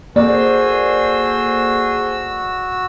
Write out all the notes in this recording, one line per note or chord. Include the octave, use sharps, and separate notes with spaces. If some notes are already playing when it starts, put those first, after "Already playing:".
A#3 F#4 G#4 A4 C5 D5 E6